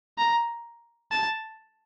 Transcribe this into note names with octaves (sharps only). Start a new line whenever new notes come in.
A#5
A5